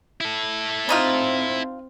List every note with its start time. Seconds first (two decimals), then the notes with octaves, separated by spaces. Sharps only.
0.21 E4 A4
0.89 C4 D4 D#4 F4